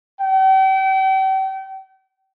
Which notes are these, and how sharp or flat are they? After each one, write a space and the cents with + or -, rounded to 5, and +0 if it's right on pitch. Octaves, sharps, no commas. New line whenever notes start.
G5 -40